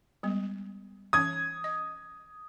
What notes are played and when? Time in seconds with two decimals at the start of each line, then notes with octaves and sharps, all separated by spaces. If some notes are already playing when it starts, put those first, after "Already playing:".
0.23 G3 G#3 B3
1.13 E3 C#4 D#6 G#6
1.64 D#5